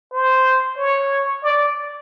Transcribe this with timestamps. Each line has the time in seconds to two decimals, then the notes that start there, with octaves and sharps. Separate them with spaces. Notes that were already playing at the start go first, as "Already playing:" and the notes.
0.13 C5
0.77 C#5
1.43 D5